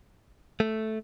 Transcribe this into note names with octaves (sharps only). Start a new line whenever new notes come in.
A3